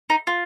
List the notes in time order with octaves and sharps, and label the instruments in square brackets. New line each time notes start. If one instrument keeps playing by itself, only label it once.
[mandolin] D#4
F4